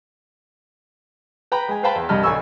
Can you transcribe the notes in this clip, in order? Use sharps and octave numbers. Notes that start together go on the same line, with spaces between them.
B4 G5 A#5 B5
G#3 G#5
B4 C5 F5 G5 A5 B5
E2
C2 G2 D#5 A5 B5 F6
B1 D3 G#5 B5 C#6 E6